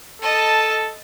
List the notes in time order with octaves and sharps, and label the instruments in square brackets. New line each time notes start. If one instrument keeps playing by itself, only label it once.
[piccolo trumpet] A4 [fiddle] D#5 A5